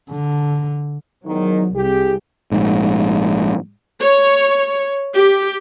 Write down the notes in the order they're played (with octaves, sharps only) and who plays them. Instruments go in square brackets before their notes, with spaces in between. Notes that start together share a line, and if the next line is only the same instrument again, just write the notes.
[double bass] D3
[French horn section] E2 G#2 D#3 [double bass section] F#3
[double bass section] C2 [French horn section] G4 G#4
[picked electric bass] A#1 G#2
[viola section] C#5
G4